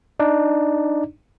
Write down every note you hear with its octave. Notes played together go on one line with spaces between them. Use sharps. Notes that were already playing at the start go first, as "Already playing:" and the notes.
D4 D#4 D5